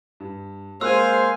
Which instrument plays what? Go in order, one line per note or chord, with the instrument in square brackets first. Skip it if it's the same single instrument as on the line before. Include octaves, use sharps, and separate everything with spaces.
[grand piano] G2
[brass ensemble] G#3 C5 [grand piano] A#3 C6 F#6 [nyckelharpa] F5 G#5 [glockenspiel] E6